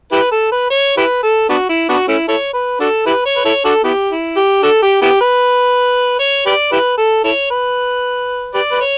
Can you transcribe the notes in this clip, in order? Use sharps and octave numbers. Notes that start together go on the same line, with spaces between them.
E4 G4 B4
A4
B4
C#5
E4 G4 B4
A4
B3 D4 F#4
E4
B3 D4 F#4
A3 C#4 E4
E4 A4 C#5
B4
D4 F#4 A4
E4 G4 B4
C#5
B4
E4 A4 C#5
D4 F#4 A4
B3 E4 G4
E4
G4
D4 F#4 A4
G4
B3 E4 G4
B4
C#5
G4 B4 D5
E4 G4 B4
A4
E4 A4 C#5
B4
G4 B4 D5
B4
C#5